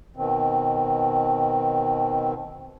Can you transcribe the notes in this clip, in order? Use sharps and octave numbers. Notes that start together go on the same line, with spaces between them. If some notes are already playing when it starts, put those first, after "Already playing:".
B2 D#3 C4